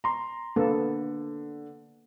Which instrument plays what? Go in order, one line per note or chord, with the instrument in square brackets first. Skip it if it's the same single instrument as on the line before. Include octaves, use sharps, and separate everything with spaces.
[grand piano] A#5 C6
[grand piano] D3 [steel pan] A#3 B3 A4